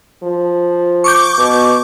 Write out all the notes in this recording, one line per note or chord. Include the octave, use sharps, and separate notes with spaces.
F3
C#6 D6 G6
B2